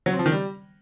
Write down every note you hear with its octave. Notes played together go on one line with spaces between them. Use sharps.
F#3
C4
F3
D#3
G3